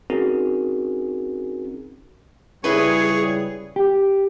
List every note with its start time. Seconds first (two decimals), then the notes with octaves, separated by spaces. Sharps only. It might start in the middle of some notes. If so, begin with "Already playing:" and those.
0.10 C4 C#4 D#4 F#4 G#4 A#4
2.64 C#2 C#3 G3 E4 G#4 B4 C#5
3.76 G4